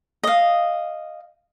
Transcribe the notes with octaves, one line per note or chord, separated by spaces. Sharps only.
D#5 F5